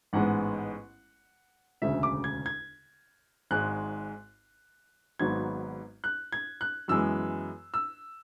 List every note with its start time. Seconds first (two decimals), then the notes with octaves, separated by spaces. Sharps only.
0.13 A1 G#2 G#3 B3 F#5
1.82 E1 D2 C#3 E5
2.03 D6
2.24 G#6
2.46 G#6
3.51 G#1 G#2 G#3 F#6
5.19 G#1 G#2 F#3 B3 G#6
6.04 F#6
6.32 G#6
6.61 F#6
6.88 F#2 E3 G#3 B3 E6
7.74 E6